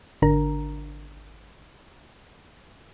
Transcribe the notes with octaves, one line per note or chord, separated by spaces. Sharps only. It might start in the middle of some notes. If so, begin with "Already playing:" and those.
G#1 D3 D4 A#4 A#5